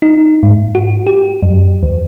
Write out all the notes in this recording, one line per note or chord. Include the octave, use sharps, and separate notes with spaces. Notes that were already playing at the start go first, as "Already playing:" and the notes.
D#4
G#2
F#4
G4
F#2
D#2